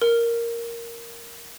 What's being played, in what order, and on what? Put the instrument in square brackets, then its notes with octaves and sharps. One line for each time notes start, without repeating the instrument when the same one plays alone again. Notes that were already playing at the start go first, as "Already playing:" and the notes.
[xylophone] A#4